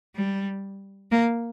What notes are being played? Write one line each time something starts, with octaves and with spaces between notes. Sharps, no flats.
G3
A#3